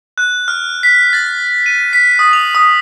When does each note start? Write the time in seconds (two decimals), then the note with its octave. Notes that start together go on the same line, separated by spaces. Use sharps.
0.18 F#6
0.48 F6
0.83 B6
1.13 A6
1.66 D#7
1.93 B6
2.19 D#6
2.33 F7
2.55 D#6